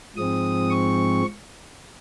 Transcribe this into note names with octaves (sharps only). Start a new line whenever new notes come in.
G#2 F3 G#3 C4 D#6
C#6